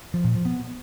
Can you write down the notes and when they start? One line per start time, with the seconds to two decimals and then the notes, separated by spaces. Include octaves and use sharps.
0.14 F3
0.24 A#2
0.35 F3
0.45 B3